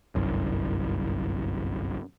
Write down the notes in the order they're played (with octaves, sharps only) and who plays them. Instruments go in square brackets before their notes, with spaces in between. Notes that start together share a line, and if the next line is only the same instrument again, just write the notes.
[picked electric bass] G1 C2 F#2